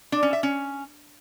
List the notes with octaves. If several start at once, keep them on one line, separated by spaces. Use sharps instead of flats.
D4
C#4
E5
C#4